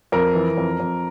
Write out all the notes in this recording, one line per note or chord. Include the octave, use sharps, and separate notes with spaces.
F2 A#4
E3
F2
F2